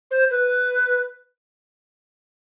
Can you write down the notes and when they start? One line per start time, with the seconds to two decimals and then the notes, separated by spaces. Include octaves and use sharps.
0.11 C5
0.31 B4